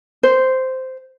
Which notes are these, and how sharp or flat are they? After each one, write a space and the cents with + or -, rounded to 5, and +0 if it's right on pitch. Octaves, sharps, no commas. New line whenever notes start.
C5 -10